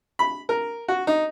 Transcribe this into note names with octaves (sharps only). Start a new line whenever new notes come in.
B5
A#4
F#4
D#4